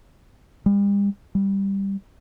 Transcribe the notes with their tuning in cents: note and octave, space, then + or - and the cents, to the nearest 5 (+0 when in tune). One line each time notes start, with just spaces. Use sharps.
G3 +40
G3 +5